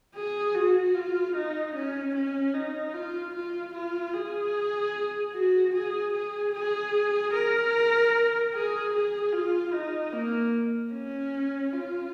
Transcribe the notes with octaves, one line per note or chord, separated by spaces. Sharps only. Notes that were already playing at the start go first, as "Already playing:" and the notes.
G#4
F#4
F4
D#4
C#4
C#4
D#4
F4
F4
F4
G#4
F#4
G#4
G#4
G#4
A#4
G#4
G#4
F4
D#4
A#3
C#4
F4